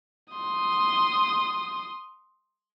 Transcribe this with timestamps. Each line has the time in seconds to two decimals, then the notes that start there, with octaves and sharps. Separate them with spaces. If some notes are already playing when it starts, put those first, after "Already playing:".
0.34 C6 D#6